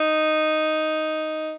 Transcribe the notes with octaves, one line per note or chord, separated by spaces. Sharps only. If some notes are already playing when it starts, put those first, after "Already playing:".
Already playing: D#4